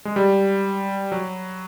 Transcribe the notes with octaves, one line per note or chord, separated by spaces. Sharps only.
G#3
G3
F#3